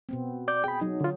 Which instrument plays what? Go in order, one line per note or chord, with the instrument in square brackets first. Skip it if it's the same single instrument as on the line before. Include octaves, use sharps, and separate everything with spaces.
[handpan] B2 B3 C4
[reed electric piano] D5 D6 G6
[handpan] G#4 [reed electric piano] G5 B5
[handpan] F#3 [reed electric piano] D#4
[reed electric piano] D3 F4